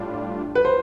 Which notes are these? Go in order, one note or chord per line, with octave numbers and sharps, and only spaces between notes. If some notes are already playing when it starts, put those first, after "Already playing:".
Already playing: A2 G3 D4 F4
B4
C5